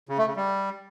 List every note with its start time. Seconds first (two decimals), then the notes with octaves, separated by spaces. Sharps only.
0.09 C#3
0.18 A3
0.27 C#3
0.36 G3